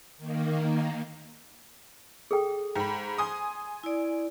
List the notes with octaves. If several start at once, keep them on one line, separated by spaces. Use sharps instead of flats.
D#3 A#3
G#4 A4 G5
G#2 G5 B5
G#5 C6 D#6
E4 D5